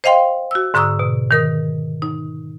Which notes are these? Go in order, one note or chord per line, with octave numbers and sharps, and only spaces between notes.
C5 D#5 F5 G5 C6
F#4 E6
G#2 D3 A#5 C#6 D#6 E6
B2
D#3 A#4 D#6
D#4